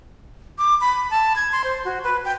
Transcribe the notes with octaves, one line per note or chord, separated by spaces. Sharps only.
D6
B5
A5
G#6
C6
C5
F#4
B4
G5